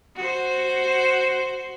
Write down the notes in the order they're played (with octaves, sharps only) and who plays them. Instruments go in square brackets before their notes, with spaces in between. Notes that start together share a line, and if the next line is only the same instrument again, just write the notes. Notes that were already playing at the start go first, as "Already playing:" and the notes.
[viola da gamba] F#4 C5